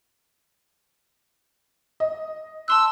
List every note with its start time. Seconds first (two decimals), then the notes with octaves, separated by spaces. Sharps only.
2.00 D#5
2.68 A5 C6 E6 F#6